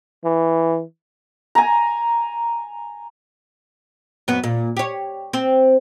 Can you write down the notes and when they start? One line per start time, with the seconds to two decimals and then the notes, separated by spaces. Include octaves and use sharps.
0.24 E3
1.55 G#5 A#5
4.28 F#2 B3
4.44 A#2
4.77 G4 C#5
5.33 C4